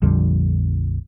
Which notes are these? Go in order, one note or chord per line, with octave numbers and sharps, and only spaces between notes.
A#1 F2 D3 G3